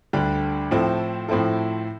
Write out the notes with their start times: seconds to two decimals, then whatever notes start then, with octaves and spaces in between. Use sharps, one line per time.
0.13 D2 D3 G3 D4 G4
0.71 A2 F3 C4 E4 A4
1.28 A2 F3 C4 E4 A4